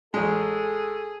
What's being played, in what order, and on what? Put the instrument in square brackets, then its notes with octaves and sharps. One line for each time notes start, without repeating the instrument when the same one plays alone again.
[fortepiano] A1 G#3 [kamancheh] G#4 [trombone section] A4